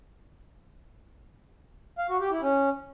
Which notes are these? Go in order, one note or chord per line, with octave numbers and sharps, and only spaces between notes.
F5
F#4
G4
E4
C#4